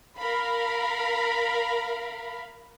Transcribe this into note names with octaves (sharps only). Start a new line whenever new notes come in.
A#4 F5 B5